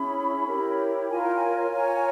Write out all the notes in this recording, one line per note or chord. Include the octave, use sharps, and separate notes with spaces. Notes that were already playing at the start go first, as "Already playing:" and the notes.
Already playing: C#4 E4 G#4 C#5 B5
E4 G4 A#4 C#5
F4 A#4 C#5 G#5
G5
G#5
F4 A#4 C#5